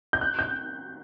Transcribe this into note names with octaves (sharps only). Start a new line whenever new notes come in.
G6
F#6
G6